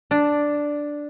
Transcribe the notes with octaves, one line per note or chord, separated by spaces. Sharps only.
D4